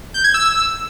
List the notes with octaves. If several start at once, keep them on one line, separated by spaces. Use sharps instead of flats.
G6
G#6
E6